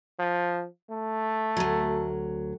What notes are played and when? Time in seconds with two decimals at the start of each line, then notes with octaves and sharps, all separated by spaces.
0.19 F3
0.90 A3
1.57 D2 F#3